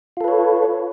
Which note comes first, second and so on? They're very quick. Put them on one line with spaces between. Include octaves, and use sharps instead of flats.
F4 A4 B4 C#5